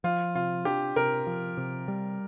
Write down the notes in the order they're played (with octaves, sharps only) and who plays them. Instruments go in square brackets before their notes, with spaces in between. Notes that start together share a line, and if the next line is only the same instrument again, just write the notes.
[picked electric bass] F3 [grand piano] F4
[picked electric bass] C3 [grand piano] F4
[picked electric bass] D4 [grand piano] G4
[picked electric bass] C3 [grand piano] A#4
[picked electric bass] F3
C3
G3